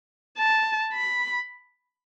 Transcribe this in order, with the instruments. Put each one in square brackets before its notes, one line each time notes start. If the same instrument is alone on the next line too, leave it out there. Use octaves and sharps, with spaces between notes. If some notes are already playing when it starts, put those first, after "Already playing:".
[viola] A5
B5